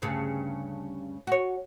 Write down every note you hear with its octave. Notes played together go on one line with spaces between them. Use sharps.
D2 G2 C#3
F#4 C#5